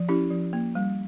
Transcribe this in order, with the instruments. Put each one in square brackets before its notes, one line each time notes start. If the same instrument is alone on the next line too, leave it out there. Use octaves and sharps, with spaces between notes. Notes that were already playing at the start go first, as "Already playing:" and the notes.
Already playing: [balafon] F3
C#4 E4 G4
F3
A#3
G3